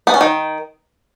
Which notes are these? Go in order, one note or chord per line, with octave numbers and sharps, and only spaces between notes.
B3
C#4
D#3